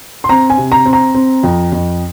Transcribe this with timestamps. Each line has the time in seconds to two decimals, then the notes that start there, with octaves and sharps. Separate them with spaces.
0.24 C6
0.29 C4 A#5
0.50 G#5
0.58 C3
0.72 A#5
0.85 C4
0.93 A#5
1.14 C4
1.43 F2
1.72 F2